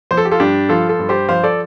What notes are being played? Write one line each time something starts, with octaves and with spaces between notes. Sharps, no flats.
F3 C5
A4
G4
F4 A4
G2 D4 G4
F3 F4 A4
F4 A4
G2
G4 C5
F3 C5 F5
A4 D5